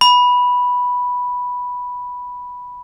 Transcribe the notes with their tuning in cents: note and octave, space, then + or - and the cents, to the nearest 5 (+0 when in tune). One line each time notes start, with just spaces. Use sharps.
B5 -5